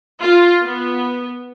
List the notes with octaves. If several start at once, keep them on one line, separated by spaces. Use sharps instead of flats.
F4
B3